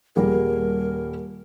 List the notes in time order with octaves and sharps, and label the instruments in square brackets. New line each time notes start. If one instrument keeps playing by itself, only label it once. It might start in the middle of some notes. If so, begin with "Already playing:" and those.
[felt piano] D#1 G3 G#4 [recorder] A#4